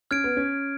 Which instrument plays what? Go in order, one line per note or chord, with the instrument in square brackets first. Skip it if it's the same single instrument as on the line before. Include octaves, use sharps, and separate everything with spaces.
[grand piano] C#4 [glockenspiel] F6 G#6 D7
[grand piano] B3
C#4